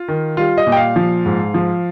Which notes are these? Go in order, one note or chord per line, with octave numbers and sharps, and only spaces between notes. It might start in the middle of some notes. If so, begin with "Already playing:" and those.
Already playing: F4
D#3
G3 F4
D#5
A#2
G5
F5
F3
G#2
F3